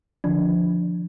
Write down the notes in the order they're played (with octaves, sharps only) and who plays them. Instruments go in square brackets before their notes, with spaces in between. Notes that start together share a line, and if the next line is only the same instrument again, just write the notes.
[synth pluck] D3 D#3 F3 D4